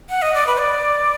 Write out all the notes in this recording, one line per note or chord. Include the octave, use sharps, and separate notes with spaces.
F#5
D#5
D5
B4
D5